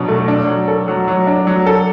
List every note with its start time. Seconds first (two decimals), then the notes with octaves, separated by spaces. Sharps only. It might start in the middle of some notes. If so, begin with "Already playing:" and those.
Already playing: B2 F#3 D4
0.09 A3
0.28 D4
0.47 F#3
0.68 A4
0.88 F#3
1.08 F#3
1.27 D4
1.47 F#3
1.66 A4